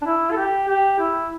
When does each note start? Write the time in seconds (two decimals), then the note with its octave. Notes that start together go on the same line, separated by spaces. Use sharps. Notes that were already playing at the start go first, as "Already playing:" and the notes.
0.02 D4
0.06 E4
0.31 A4
0.37 G4
0.68 G4
0.99 E4